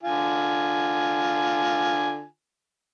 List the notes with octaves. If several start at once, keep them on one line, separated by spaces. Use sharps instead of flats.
D3 F4 G#5